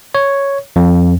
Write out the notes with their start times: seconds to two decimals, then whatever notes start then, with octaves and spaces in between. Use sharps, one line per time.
0.15 C#5
0.76 F2